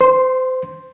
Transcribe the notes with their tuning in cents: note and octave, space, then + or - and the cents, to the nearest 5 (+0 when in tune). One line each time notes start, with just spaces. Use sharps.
C5 -30 C6 +0